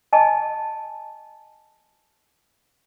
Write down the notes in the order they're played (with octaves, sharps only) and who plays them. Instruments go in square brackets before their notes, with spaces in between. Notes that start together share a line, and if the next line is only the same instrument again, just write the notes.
[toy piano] D#5 G#5 A5